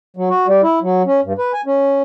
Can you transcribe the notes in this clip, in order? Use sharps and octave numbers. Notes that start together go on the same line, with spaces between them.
F#3
F#4
G3
E4
F#3
C#4
G2
B4
G#5
C#4